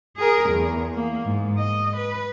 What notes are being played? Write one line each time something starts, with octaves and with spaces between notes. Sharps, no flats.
G#4 A#4
E2
A#3
G#2
D#5
B4